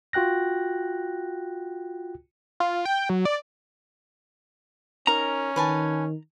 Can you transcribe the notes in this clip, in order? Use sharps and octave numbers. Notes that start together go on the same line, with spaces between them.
F4 F#4 G5 F#6 A#6
F4
G5
F#3
D5
C#4 D#4 A#4 A#5
D#3 B4 G#5 A5